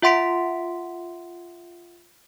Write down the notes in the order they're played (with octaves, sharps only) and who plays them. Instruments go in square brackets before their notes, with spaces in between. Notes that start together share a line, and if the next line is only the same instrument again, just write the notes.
[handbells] F4 E5 F#5 C6 B6 D7